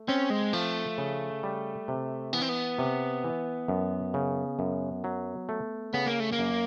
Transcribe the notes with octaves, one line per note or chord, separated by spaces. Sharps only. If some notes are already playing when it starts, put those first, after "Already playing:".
Already playing: A3
C4 C#4
G#3
F3 A3
C#3
G3
C3
E3 B3
C4
B3
C3
E3
F#2
C#3
F#2
F#3
A3
C#3 B3
A#3
A3
A#3
F#2